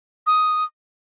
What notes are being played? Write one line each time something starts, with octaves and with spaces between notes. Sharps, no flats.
D#6